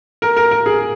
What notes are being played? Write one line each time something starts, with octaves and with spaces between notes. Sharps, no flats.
A#4
A#4
A#4
G#4